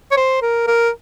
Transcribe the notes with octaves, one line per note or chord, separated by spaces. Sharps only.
C#5
C5
A#4
A#4